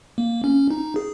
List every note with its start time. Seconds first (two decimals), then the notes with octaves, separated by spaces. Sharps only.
0.18 A#3
0.44 C#4
0.70 D#4
0.96 G#4